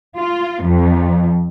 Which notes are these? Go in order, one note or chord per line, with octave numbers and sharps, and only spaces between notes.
F4
F2